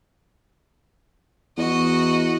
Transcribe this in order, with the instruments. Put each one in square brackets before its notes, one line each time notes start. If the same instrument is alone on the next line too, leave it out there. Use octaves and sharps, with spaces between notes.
[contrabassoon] E2 [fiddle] F#4 D#5